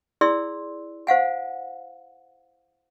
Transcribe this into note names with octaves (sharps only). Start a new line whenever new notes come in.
E4 G#4 D5 C6 E6
C5 F5 F#5 G#5